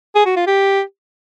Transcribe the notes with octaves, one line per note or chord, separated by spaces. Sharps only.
G#4
F#4
F4
G4